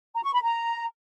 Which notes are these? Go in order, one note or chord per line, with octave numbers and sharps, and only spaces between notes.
A#5
C#6
B5
A#5